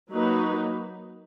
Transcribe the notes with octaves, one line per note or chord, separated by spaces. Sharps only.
F#3 A#3 D#4 F#4 B4